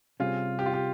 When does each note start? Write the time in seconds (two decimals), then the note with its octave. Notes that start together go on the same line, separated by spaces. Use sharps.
0.20 C3 G3 C#4 F4 G#4
0.59 G4
0.66 F4
0.74 G4